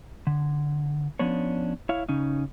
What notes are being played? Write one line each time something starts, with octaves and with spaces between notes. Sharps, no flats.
D3
F3 B3 C#4 D4 C#5
E4 C#5 F5
C#3 C#4 D#4